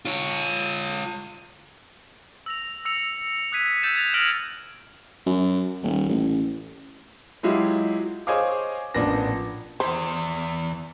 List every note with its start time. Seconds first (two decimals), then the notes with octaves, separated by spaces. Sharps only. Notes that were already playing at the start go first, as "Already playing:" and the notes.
0.05 F4 C#5
2.46 E6 A#6 F7
2.85 E6 C#7 F7
3.52 D#6 F#6 G#6 B6 D#7
3.83 E6 G6 A6 B6 E7
3.95 G#6 A6 F7
4.14 F6 G6 A#6 D7 F7 F#7
5.26 F#2
5.83 D#1
6.09 A1
7.43 F#3 G#3 E4 F4 G4
8.27 G#4 C5 C#5 D#5 F5 D6
8.94 A1 A#2 F3 B3 D4 A#6
9.80 E2 C5